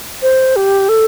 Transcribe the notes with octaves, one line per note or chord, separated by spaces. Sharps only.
C5
G4
A4